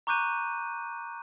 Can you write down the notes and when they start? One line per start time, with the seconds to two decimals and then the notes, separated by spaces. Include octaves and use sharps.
0.07 A#5 C#6 D6 F#6 G6 D#7